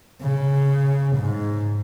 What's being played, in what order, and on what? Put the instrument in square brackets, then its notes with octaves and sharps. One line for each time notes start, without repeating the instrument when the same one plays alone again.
[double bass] C#3
G#2